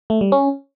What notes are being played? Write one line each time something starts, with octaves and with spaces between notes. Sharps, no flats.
A3
G3
C#4